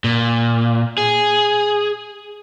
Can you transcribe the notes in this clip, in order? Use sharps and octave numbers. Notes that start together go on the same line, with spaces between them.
A#2
G#4